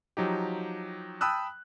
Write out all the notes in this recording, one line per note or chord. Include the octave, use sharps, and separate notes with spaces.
F3 F#3 D#4 G4
G5 A5 B5 D#6 E6 F#6